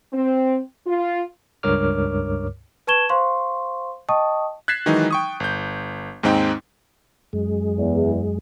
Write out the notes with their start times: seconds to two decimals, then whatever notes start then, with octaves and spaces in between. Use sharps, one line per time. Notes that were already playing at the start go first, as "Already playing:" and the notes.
0.12 C4
0.86 F4
1.63 C#2 G2 A#4 C#5 D6 F6
2.87 B4 A5 C#6 G#6 E7 G7
3.09 C5 F5 C6 C#6
4.09 D#5 G5 A5 C#6 D#6
4.68 F#6 G#6 A6 B6 C7 E7
4.86 D#3 E3 F#3 G#3 D#4
5.11 G5 C#6 D#6
5.40 G1 G6
6.23 D#2 G#2 G#3 C4 D#4 G5
7.33 F#2 G#3
7.77 E2